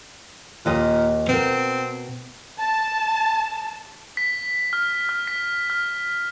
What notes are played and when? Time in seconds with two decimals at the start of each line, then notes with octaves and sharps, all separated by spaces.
0.66 D#2 A#2 D#5
1.29 B2 C4 A#4
2.59 A5
4.17 B6
4.73 F6
5.09 F6
5.27 B6
5.70 F6